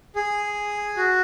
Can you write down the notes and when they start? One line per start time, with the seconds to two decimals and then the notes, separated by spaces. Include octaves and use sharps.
0.16 G#4
0.97 F#4